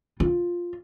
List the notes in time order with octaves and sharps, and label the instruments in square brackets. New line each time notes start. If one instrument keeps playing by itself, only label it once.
[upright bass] F4